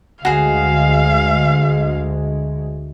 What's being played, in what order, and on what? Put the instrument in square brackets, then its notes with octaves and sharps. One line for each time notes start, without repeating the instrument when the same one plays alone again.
[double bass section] D2 G#3 [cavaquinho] F#4 G#4 [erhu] F5